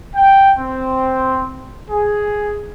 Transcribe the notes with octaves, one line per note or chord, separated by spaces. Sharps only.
G5
C4
G#4